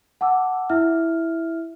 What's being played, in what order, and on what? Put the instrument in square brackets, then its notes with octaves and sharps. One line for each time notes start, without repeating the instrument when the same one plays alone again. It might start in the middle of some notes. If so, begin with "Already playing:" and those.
[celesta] F#5 A5 D6 E6
E4 E5 F6